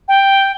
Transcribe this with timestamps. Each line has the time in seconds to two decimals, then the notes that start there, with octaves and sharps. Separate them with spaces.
0.08 G5